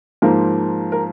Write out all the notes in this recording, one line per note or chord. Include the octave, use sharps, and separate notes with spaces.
G#2 F3 A#3 A#4
A#4